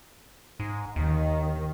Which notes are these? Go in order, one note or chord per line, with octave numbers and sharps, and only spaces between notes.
G#2
D#2 D#3